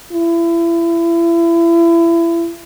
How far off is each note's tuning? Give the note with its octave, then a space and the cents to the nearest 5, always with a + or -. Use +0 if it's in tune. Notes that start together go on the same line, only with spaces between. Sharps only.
E4 +30